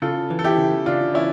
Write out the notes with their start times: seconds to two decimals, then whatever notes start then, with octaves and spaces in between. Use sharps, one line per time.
0.02 C#3 F4 A4
0.30 E3
0.39 A4
0.44 E4 G4
0.58 C#3
0.86 C#3 D4 F4
1.14 E3 C#4 E4